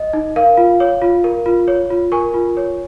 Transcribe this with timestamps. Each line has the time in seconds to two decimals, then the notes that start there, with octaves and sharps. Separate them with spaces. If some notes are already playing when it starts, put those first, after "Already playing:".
Already playing: D#5
0.13 D#4
0.36 A#4 F5
0.57 F4
0.80 C#5
1.02 F4
1.24 A#4
1.46 F4
1.68 C#5
1.90 F4
2.12 A#4 G#5 C#6
2.34 F4
2.57 C#5